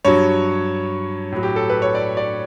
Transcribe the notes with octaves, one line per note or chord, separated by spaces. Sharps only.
G2 F#3 C#5
A2 F#3
G4
A4
B4
C#5
D5
D5